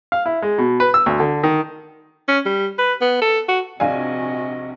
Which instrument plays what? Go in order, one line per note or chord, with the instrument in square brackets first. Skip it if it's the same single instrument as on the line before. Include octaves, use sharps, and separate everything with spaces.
[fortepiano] F5
E4
G#3
B2
B4
E6
D2
D3
D#3
[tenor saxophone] C#4
G3
B4
B3
A4
F#4
[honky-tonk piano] A#1 G#5 [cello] C3 F#4 [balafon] D5 F5 [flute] D#5